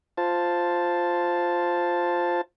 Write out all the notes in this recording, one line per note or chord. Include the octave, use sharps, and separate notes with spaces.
F4 C5 A5